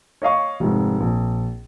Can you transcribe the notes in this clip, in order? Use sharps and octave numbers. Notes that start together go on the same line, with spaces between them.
C#5 D#5 F5 C#6
F1 G#2
A#1